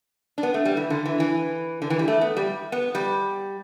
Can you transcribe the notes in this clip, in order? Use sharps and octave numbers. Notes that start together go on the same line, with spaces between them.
D4
B3
A3
G3
E3
D3
E3
E3
D3
E3
G3
A3
B3
G3
B3
G3